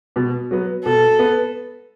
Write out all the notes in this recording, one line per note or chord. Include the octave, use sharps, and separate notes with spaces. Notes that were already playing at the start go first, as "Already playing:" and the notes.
B2
F#3 B3
B2 A4
B3